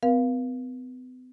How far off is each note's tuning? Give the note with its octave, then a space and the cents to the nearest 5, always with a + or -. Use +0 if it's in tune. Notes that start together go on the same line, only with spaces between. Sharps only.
B3 +45 A#4 +45 F5 +0